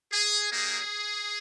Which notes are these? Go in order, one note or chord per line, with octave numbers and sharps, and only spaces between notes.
G#4
G3 A#3 D#4 G#4